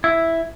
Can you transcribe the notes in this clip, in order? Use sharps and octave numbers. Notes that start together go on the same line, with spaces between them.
E4